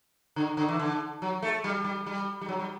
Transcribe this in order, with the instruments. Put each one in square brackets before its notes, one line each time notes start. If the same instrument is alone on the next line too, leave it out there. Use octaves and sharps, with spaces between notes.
[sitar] D3
D3
E3
D3
F#3
A3
G3
G3
G3
G3
F#3
G3